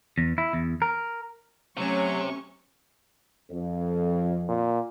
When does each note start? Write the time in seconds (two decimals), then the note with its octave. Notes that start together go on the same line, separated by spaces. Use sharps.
0.18 E2
0.38 E4
0.53 E2
0.82 A#4
1.77 C3 F#3 A3 C#4 C#6
3.51 F2
4.49 A#2